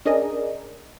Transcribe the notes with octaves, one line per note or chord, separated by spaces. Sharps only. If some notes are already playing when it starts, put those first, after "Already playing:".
C#4 D4 G#4 A#4 D5 D#5